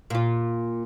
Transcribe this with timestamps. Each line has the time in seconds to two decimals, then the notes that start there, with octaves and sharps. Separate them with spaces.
0.10 A#2 F4